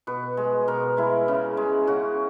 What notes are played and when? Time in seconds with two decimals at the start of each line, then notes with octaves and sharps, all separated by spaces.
0.07 B2 B4
0.37 G#3
0.68 B2 A#4
0.97 G#3 E4
1.28 C#3
1.57 G#3
1.87 C#3 F#4